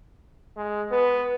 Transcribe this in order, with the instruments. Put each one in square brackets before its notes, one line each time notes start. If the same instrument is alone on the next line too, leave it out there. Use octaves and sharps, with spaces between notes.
[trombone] G#3
[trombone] B3 [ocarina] B4